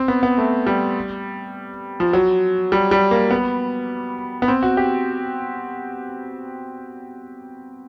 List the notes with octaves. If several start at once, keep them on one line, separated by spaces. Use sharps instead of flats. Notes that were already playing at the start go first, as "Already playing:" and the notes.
Already playing: C4
B3
B3
A3
G3
F3
F#3
G3
G3
A#3
B3
B3
C4
F#4
G4